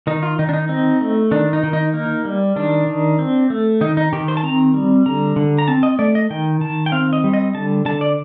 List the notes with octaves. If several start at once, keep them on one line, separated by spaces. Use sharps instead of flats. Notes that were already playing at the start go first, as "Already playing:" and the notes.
D#3 D#4
F4
D#3 D#4
D4
D#4
C4 D#4
A3
D#3 D4
D#4
D#3
D#4
A#3
G3
D#3 D4
D#3
C4
A3
D#3 D#4
D#4
D#3 G4
C5
A5
C4 A#5
G3
D3 A#5
D3
A#5
C4 A5
D#5
A3 D5
D#5
D#3 G5
D#3 A5
G5
C4 F5
D#5
G3
D#5
D3 A5
D3 A5
D5